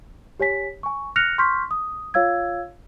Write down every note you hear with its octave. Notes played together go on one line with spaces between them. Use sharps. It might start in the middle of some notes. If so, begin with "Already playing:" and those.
G4 C#5 G#5 B6
G#5 C#6
F6 F#6 A#6 C#7 F7
C6 C#6 F6 G6 B6
D#6
F4 C#5 F5 E6 G#6